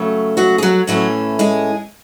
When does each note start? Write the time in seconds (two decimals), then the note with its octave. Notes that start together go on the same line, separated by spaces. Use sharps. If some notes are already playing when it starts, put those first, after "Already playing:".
Already playing: C#3 F#3 A3
0.37 F#3 F#4
0.58 G#4
0.63 F#3 F#4
0.87 A2 E3 F#3 A3 C#4 F#4
1.39 G#3 G#4